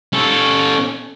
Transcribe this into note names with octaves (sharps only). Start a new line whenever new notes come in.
C#4 A4